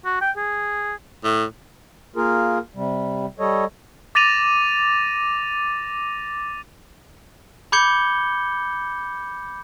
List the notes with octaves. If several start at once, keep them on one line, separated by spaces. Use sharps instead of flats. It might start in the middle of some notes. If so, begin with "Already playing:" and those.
F#4
G5
G#4
A2
A#3 F4 G#4 A#4
C3 G3
G3 A4 C#5 D#5
D6 A6 A#6 D#7 F7
B5 D6 G6 G#6 C#7 G7